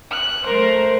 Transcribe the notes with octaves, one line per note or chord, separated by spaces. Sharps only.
F#6
A3 A#4 C5